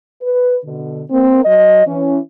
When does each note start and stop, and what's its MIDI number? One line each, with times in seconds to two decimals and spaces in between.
0.22 0.56 71
0.64 1.03 47
0.64 1.03 50
1.10 1.42 58
1.10 1.42 60
1.44 1.84 54
1.44 1.84 75
1.87 2.18 52
1.87 2.18 61